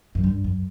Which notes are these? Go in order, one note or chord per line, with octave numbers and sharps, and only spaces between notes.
F#2
G2
F#2